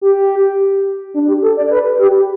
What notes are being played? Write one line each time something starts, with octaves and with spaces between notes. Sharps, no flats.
G4
D4
G4
A4
D5
B4
G4